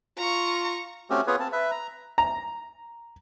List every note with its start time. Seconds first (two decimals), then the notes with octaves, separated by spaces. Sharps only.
0.18 F4 A#5 C#6
1.10 A3 C4 C#4 F#4 G4
1.27 B3 F4 G#4 B4 C#5
1.40 C4 A5
1.52 B4 E5
1.71 A#5
2.18 A#5